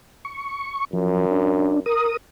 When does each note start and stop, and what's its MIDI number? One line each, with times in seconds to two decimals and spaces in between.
0.25 0.85 85
0.93 1.82 42
0.93 1.25 53
1.31 1.80 62
1.86 2.17 70
1.86 2.17 87